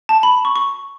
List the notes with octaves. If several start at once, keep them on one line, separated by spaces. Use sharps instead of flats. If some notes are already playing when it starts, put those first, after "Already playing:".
A5
B5
C#6
C#6